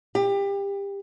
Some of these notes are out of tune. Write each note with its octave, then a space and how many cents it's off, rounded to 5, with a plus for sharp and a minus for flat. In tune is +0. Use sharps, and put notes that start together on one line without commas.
G4 +25